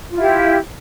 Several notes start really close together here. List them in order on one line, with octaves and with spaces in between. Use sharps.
F4 E4 G4